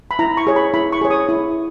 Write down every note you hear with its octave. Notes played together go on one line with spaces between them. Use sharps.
B5
E4 A#5
C#6
G#4 C#5
B5
E4 B5
C#6
G#4 C#5
D#6
E4